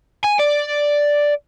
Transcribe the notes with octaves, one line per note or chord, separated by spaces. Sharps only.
G#5
D5